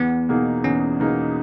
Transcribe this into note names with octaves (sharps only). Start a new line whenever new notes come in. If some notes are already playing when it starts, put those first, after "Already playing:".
Already playing: E2 B3
B2 A#3 D#4 G#4
E2 C#4
B2 A#3 D#4 G#4